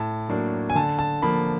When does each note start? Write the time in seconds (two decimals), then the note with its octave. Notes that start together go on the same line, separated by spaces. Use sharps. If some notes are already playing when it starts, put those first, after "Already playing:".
Already playing: A2 A5
0.29 F#3 A#3 D4
0.70 G#5
0.75 D3 A5
0.99 A5
1.22 F3 A#3 B5